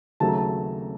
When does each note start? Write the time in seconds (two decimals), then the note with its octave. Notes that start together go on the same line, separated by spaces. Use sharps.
0.20 D#2 C#3 F#3 A3 A5
0.28 A#5
0.37 A5